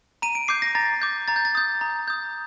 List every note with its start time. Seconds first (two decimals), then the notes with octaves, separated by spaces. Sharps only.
0.22 A#5 D#7
0.35 D7
0.48 D6 G6 C7
0.62 A#6
0.75 A#5 A6
1.02 D6 G6
1.28 A#5 A6
1.36 G6
1.45 A6
1.55 D#6 G6
1.81 A#5
2.08 D#6 G6